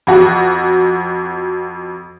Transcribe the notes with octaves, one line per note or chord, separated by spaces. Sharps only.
F2 F#4